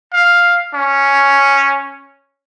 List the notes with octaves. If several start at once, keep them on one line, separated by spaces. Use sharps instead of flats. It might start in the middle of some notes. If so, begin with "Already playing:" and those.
F5
C#4